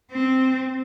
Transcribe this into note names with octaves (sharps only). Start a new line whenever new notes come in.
C4